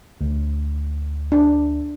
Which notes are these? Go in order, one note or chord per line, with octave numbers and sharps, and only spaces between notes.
D2
D4